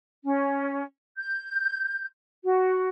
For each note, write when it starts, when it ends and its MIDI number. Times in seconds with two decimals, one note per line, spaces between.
0.25 0.84 61
1.18 2.05 91
2.44 2.89 66